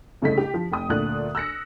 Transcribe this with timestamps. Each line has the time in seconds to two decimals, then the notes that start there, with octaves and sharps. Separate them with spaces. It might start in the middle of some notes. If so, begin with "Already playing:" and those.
0.22 C2 C#3 A3 A4 D#5 B6
0.38 G4
0.54 F3
0.72 F1 G5 D#6
0.89 D2 A#2 A3 D5 F#6
1.35 E6 F#6 A#6 C#7